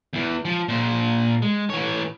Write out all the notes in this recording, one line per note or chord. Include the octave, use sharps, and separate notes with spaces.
E2 E3
F3
A#2 C5
G#3
E3 C#5